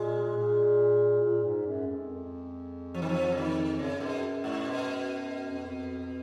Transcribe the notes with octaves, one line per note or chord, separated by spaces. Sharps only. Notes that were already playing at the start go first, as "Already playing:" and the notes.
Already playing: A#2 G#3
A#2
A#2
G#2
F#2
F2
F3
D#3
F3
C#3
D#3
F#2 C#3
B2
G#2
B2
F2